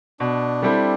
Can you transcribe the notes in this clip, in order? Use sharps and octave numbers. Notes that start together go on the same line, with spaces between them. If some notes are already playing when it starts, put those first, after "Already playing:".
B2 D4
G3 C4 E4 A4